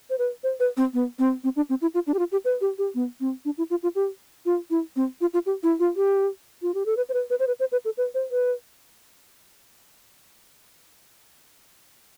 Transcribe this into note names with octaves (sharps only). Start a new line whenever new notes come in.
C5
B4
C5
B4
C4
B3
C4
C4
D4
C4
E4
F4
D4
G4
F4
G4
B4
G4
G4
B3
C4
D4
E4
F4
F4
G4
F4
E4
C4
F4
F4
G4
E4
F4
G4
F4
G4
A4
B4
C5
B4
B4
C5
B4
C5
B4
A4
B4
C5
B4